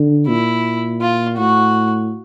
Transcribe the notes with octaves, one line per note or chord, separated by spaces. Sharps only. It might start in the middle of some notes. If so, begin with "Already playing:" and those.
Already playing: D3
A#2 E4
F4
A2 F#4